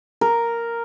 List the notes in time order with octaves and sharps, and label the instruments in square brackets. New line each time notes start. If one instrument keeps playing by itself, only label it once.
[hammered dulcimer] A#4